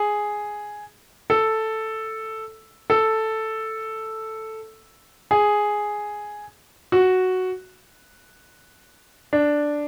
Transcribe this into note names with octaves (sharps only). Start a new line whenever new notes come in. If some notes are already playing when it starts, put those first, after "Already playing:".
Already playing: G#4
A4
A4
G#4
F#4
D4